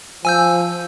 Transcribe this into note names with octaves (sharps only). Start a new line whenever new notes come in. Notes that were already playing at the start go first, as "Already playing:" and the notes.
F3 G#5 E6 G6